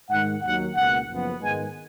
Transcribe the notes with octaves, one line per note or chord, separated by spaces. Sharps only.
G#2 D#3 G#3 F#5
D#2 D#3 F#3 F#5
C#2 B2 A#3 F#5
F#1 F#2 F3 B3
G#2 D#3 G#3 B3 G#5